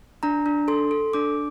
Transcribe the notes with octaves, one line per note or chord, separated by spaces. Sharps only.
D4 A#5
D4
A4 C6
A4
D4 D6